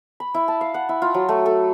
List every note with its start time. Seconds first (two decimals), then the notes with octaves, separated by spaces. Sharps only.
0.20 B5
0.34 E4
0.48 A5
0.61 F5
0.74 F#5
0.89 E4
1.02 F4
1.14 F#3
1.29 A3
1.46 A4